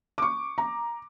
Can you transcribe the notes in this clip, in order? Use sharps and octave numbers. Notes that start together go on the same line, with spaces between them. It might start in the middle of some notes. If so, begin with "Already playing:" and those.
C#6 D6
A#5